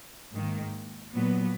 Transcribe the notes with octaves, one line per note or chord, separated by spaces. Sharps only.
G#2 D#3 A#3
A#2 F#3 B3